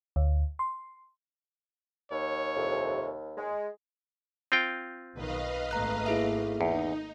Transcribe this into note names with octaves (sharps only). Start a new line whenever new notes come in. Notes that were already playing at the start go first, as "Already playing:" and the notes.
D2
C6
D#2 C#5
C2 F2 C3
G#3
C4 F4 G5
B1 D#3 B4 D#5 F5
G#1 A3 A#3 A#5 F#6
E4 G#4 E5
E2 D#4